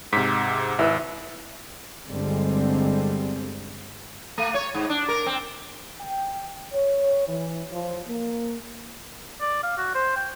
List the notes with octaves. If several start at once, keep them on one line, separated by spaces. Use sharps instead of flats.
G#2 C3 B6
G#1 E4 B4 E5
G1 D3 G3 G#3 C4
A3
C#5
G#2
D4
A#4
C4
G5
C#5
E3
F3
A#3
D5
F5
F#4
C5
G5